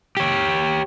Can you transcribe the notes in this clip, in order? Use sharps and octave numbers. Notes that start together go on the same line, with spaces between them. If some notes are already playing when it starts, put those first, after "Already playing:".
G4 C#5